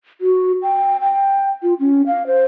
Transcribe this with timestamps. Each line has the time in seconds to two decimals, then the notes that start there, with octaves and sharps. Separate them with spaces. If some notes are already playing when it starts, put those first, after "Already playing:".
0.21 F#4
0.62 G5
1.01 G5
1.63 F4
1.80 C#4
2.07 F5
2.27 C5